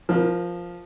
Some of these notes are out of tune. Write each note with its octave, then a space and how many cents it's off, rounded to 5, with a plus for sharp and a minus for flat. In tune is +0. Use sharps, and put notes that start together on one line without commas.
F3 +0 A#4 +20